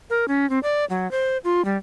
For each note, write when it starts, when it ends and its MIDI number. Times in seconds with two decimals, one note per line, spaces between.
0.10 0.25 70
0.28 0.49 61
0.50 0.59 60
0.63 0.85 74
0.90 1.10 54
1.11 1.37 72
1.44 1.64 65
1.65 1.77 55